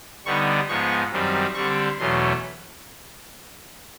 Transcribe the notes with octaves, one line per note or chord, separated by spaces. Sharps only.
D3 G3 B3 D#4 C#6
G#2 F3 G#3 B3 C#6
F#2 D#3 G3 C4
D3 G3 C4 C#6
E2 B2 F#3 A3 C#4 C6